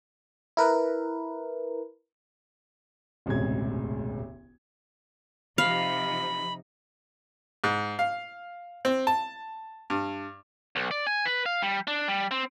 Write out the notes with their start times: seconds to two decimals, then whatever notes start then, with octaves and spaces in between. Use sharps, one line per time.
0.57 E4 A#4 B4
3.26 E1 A1 D2 C3 G#3 G#6
5.58 C3 F3 D#4 F5 B5
7.64 G#2
7.99 F5
8.85 C4
9.07 A5
9.90 G2
10.76 B1
10.91 D5
11.07 G#5
11.26 B4
11.46 F5
11.62 G3
11.88 D4
12.08 G3
12.31 C4